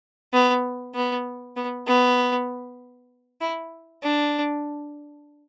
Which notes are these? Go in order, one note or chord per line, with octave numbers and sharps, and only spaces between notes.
B3
B3
B3
B3
E4
D4